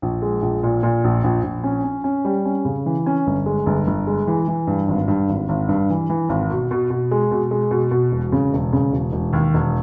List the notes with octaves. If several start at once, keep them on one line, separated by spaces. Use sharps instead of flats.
A#1
G#3
A#1
A#2
A#2
A#1
A#1
A#1
C#4
C#4
C#4
G3
C#4
C#3
E3
C#4
G1
G#3
G1
G1
G#3
E3
E3
G2
G#1
G2
G#1
G#1
G2
E3
E3
G#1
B2
B2
B2
G#3
B2
G#3
B2
B2
E1
C#3
E1
C#3
E1
E1
D#2
E1